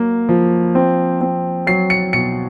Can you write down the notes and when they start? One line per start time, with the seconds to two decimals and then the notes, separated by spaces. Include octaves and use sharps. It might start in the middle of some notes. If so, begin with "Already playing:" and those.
Already playing: F#3 A#3
0.29 F3
0.75 C4
1.21 C4
1.67 F#3 C7
1.90 C#7
2.13 B2 C#7